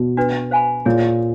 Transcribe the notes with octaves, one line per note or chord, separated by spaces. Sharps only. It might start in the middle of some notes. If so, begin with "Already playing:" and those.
Already playing: B2
D4 F#4 B4
C5 F5 G#5 B5
A#2 E4 G#4 C#5